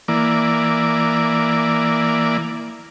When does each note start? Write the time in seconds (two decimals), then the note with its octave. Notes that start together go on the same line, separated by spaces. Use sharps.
0.08 E3 A#3 D5